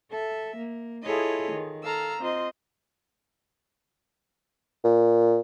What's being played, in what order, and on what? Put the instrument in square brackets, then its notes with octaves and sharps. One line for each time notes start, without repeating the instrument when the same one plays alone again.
[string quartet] A4 E5
A#3
E4 F4 G#4 A4 C#5 D#5
D#3
A4 F5 A#5 E6
C4 F4 C5 D#5
[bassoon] A#2